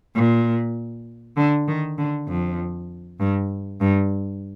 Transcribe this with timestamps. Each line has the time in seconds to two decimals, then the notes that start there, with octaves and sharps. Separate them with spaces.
0.15 A#2
1.37 D3
1.68 D#3
1.98 D3
2.28 F2
3.20 G2
3.81 G2